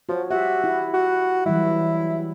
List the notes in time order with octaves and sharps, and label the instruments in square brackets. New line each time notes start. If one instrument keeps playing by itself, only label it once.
[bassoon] F3 [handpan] F#4 C#5
[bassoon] F#4 [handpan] G4 E5
[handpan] E4
[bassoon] F#4
[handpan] E3 F#3 G3 [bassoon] E4